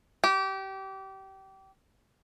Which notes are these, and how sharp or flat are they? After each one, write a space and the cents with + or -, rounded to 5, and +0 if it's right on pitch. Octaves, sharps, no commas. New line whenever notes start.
G4 -25